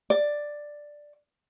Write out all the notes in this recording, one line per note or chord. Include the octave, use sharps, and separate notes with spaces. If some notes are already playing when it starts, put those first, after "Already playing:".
D5